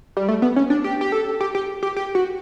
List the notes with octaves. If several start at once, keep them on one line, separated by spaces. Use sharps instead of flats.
G3
A3
B3
C#4
D4
G4
G4
A4
G4
G4
G4
G4
F#4